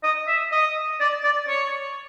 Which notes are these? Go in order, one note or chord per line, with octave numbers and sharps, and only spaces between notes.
D#5
E5
D#5
D5
D5
C#5